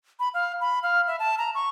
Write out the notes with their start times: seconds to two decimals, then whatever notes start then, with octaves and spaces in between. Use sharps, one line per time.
0.20 B5
0.34 F5
0.61 B5
0.83 F5
1.07 E5
1.19 A5
1.38 A#5
1.55 C#6